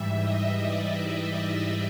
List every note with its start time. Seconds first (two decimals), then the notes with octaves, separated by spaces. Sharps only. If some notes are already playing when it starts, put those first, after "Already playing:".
Already playing: G#2 E3 G3 E5
0.17 D#5
0.58 D5
1.39 D5